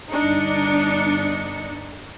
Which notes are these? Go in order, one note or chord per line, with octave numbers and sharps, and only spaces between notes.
G1 D4 D#4 C#7